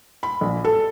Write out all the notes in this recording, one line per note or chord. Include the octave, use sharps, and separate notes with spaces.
B5
A#1
A4